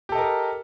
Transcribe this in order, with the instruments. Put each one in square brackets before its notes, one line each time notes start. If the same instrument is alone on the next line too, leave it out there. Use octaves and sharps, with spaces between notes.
[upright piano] G4
A4
D#5
A#4